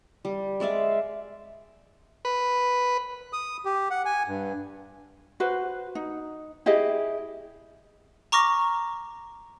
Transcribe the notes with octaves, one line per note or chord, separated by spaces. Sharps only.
G3
G#3 D5 E5 F5
B4
D#6
G4
F#5
G#5
G2
F#4 B4 C5
D#4
E4 G4 G#4 D#5
A#5 C#6 D6 F6 A#6